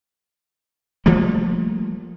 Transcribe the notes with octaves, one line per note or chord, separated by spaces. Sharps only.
F3 G3 A3 A#3